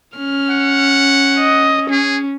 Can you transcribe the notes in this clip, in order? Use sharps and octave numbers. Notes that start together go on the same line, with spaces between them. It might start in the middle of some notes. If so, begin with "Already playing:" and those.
C#4 F6
F#5
D#5
C#4 G#4